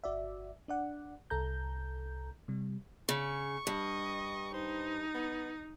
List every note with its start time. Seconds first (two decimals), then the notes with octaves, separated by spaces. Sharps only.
0.04 G1 F#4 D5 E5
0.68 D4 D5 F#5
1.30 C2 A4 A#5 G6
2.48 C3 G3
3.09 C#3 C#6
3.67 G2 D#5
4.54 D#4 C5
5.14 B3